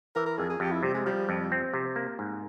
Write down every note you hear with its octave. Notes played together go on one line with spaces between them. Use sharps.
E3 A#4
A#4
F2 G#4
G#4
F2 G4
E4
C3 G3
G#3
F3 G3
F2
C4
C3
A#3
G#2